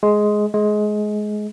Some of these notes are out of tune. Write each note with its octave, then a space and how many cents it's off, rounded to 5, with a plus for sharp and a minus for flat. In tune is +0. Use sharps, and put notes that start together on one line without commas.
G#3 +10
G#3 +20